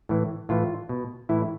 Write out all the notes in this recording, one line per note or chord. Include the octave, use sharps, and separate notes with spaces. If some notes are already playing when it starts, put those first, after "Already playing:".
A2 E3
A2 E3 F4
B2
A2 E3 E4